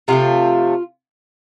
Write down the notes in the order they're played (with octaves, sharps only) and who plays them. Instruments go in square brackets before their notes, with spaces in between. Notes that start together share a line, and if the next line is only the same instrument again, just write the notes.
[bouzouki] C3 F3 A3 F4